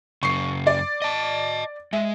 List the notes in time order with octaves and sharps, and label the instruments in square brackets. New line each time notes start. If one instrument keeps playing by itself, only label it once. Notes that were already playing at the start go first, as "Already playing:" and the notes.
[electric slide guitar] F#2 C#3 [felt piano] C#6 C7
[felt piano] D5
[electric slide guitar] D#5 A5
[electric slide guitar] G#3 [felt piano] E5